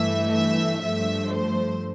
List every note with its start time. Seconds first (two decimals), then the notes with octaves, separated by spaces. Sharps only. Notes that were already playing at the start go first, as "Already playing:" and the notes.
Already playing: G2 E3 A3 E5
0.32 E5
0.82 G2 F3 A3 E5
1.33 C5